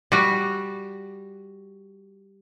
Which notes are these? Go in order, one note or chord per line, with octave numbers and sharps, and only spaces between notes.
G3 F#4